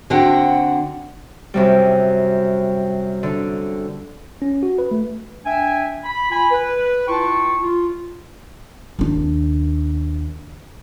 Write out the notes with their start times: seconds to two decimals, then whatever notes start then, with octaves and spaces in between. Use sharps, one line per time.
0.10 D3 C4 D4 F#4 F#5 G5
1.54 F#2 C3 G3
3.23 D3
4.42 C#4
4.63 F#4
4.78 B4
4.91 A3
5.45 D4 E5 G5 G#5
6.04 B5
6.30 F4 G#5 B5
6.51 B4
7.07 E4 F4 G5 A5 C#6
7.62 F4
8.99 D#2 D4